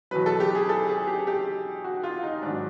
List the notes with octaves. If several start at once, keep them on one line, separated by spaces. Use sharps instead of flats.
E2 B2 F#3 B4
A4
G4
G#4
A4
G#4
G4
G4
F#4
F4
D#4
G#2 D#3 F#3 D4